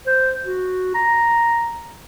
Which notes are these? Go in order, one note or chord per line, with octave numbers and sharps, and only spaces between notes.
C5
F#4
A#5